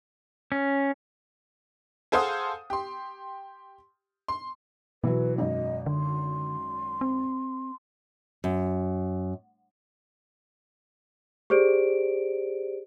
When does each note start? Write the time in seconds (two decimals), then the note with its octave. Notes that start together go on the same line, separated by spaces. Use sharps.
0.52 C#4
2.12 G#4 A4 C5 F5 F#5 D#6
2.70 G4 C6
4.28 C6
5.04 B2 E3 F#3 B4
5.38 G#1 F#2 D#5
5.86 D3 C6
7.01 C4
8.44 F#2
11.50 G4 G#4 C5 D5 D7